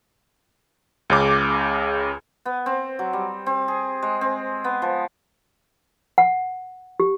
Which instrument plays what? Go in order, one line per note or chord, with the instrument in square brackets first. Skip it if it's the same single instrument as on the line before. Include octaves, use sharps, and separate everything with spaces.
[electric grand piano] C#2 C#3 D6
[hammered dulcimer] B3
C4
F#3
G3
C4
G#4
G#3
C4
B3
F3
[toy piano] F#5
G4